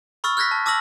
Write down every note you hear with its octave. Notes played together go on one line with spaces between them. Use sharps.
B5 C#6 E6 F6 A6
F6 F#6 G#6 A#6 B6
A5
A5 D6 E6 F6 A#6 F#7